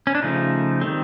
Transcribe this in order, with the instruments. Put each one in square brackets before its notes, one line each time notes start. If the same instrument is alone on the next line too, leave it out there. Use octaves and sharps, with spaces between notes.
[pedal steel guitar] C#4
D4
C#3 F3 A3 D#4
D#3 G3 C4